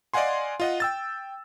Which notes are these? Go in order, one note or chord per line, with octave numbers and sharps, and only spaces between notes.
D5 D#5 F5 F#5 G#5 C6
F4 D#5 F#5
G5 E6 A6